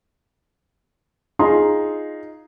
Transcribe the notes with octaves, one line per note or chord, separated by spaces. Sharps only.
D#4 F4 G#4 A#5 C6